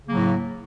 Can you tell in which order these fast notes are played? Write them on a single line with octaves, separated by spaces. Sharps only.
C#3 A#3 F#3 A2